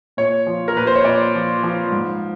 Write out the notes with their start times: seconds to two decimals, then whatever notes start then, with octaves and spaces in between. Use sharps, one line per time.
0.17 A#2 C#5
0.46 F3
0.68 A#4
0.76 A#2 B4
0.87 C5
0.95 C#5
1.05 A#2 D5
1.35 F3
1.63 F3
1.92 G#2